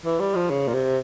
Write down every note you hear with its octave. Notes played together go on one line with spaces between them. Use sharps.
E3
G3
F3
C#3
A#2
C3